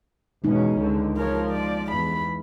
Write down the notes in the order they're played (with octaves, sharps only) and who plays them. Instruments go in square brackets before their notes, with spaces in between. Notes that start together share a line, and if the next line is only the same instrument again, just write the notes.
[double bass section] E2 B2 C#4 [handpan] G#3 D#4
[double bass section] C#2 D3
[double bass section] F3 [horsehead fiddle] A#4 C#5
[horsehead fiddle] D5
[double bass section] E2 [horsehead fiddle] B5